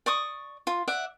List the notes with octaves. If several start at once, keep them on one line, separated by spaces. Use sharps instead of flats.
D5 C#6 D#6
F4
D5 E5 F#5